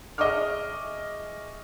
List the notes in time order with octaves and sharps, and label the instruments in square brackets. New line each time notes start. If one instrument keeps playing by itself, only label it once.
[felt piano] G#4 D#5 E5 C#6 D6 F6